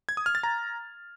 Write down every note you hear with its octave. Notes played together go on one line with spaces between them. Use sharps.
G#6
D#6
F6
A6
A#5